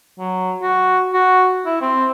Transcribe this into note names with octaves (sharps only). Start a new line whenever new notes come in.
F#3
F#4
F#4
E4
C4